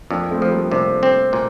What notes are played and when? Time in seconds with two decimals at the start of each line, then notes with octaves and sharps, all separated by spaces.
0.10 F2 A#3 D4
0.31 A3 C4
0.42 F3
0.51 G3 A#3
0.71 C3 A#3 D4
1.03 C4
1.33 A#2